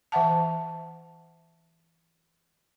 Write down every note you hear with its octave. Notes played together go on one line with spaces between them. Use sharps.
E3 E5 F#5 A5